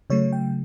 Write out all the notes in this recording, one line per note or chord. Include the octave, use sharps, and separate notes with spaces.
C#3 F#3 A3 C#5
G5